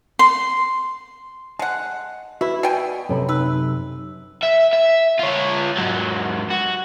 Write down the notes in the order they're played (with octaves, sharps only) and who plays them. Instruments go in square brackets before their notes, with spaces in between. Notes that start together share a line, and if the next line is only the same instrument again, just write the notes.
[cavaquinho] C6
[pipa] G#3 F#5 [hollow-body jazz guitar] A5
[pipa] E4 [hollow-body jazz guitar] F#4 B4
[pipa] B2 G5 G#5 [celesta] D5
[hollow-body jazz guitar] F#2 C3 B5 [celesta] A4 B4 C#5
[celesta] D#4 E6 [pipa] B4
[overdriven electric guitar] E5
E5
F4 C#5
G#2 F#3
F#4